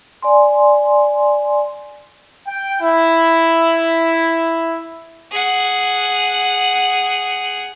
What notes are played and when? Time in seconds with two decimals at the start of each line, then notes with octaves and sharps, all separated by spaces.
0.22 D5 G#5 C6
2.47 G5
2.79 E4
5.32 G#4 F#5